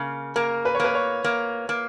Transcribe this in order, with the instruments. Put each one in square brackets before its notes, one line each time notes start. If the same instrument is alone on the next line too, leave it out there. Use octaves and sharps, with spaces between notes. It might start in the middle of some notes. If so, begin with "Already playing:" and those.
Already playing: [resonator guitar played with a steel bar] C#3 A#3
[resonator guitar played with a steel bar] A#3 [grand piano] A#4
[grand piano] B4
C#5
[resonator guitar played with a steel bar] A#3 [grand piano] B4
[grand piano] C#5
[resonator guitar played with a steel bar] A#3
A#3